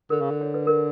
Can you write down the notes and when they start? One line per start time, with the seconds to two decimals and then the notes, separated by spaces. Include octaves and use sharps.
0.10 D3 A#4
0.21 C#3
0.31 D3
0.41 C#5
0.54 B4
0.67 A#4